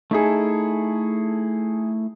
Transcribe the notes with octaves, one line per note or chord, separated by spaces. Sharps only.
A3 D#4 E4 G#4 A4